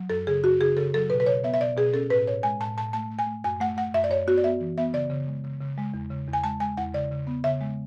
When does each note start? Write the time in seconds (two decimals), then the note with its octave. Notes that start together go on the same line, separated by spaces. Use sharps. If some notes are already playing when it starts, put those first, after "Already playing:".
Already playing: F#3
0.10 F#2 A4
0.27 C#3 G#4
0.44 F#2 F#4
0.60 C#3 G#4
0.77 C#3 A4
0.94 F#3 A4
1.10 B2 B4
1.20 B4
1.26 B2 C#5
1.43 B3 E5
1.54 E5
1.60 B2 D5
1.77 B2 G#4
1.93 C#4 A4
2.10 A2 B4
2.28 A2 C#5
2.43 G#3 G#5
2.60 A2 A5
2.78 A2 A5
2.93 A3 A5
3.11 A3
3.19 G#5
3.27 A3
3.44 F#2 G#5
3.61 A3 F#5
3.77 A3 F#5
3.94 F#2 E5
4.04 D5
4.10 F#2 C#5
4.27 B3 F#4
4.37 D5
4.44 B3 E5
4.60 E3
4.78 B3 E5
4.93 C#3 D5
5.10 C#3
5.28 G#3
5.44 C#3
5.61 C#3
5.78 G#3
5.94 E2
6.10 C#3
6.28 E2
6.33 G#5
6.44 G#3 A5
6.60 G#3 G#5
6.77 E2 F#5
6.94 C#3 D5
7.12 C#3
7.27 B3
7.44 C#3 E5
7.61 G#3